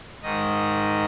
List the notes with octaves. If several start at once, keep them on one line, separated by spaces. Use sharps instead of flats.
G#2 D#3 D#5